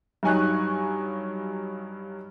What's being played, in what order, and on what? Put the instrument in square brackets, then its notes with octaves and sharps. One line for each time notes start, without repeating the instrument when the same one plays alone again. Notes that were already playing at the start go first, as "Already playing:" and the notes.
[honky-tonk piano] G2 F#3 D#4 G#5 C#6 F#6